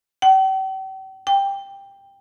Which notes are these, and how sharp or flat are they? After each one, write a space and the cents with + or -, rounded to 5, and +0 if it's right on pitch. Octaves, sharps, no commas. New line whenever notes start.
G5 -40
G5 +15